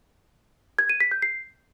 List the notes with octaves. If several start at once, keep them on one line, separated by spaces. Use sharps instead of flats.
G#6
D#7
B6
G6
C7